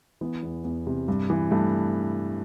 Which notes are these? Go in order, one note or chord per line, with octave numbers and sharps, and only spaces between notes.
E3 B3
E2
E2
C3
G2
E3
G2 A3